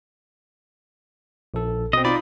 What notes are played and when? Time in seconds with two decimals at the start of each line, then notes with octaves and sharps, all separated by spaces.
1.54 A#1 A4
1.93 B2 C4 D#5
2.05 D#4 F4 D5 B5